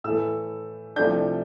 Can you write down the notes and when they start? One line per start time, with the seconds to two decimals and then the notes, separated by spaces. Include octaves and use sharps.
0.04 A2 E3 A3 E6
0.96 C2 C3 F3 A3 D4 G6